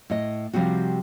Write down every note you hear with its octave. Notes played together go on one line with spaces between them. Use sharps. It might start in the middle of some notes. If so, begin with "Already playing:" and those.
A2 D#5
C3 F3 G3 C4 F#4